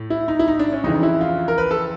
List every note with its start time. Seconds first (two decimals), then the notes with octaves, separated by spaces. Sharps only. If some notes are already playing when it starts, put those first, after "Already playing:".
Already playing: A2
0.10 E4
0.28 D#4
0.39 E4
0.48 D#4
0.59 D4
0.72 C#4
0.84 F2 C#3 E3 D#4
1.03 E4
1.21 F4
1.48 A#4
1.58 B4
1.71 A4